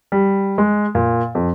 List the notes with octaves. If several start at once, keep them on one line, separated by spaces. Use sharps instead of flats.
G3
G#3
A#2
F2